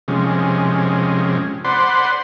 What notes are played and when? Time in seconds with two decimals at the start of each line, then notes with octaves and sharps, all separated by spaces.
0.08 C3 F3 G#3 C#4
1.65 C5 D5 F#5 B5 C6